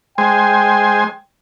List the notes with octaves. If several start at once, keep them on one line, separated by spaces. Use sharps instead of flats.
G#3 C5 G5 G#5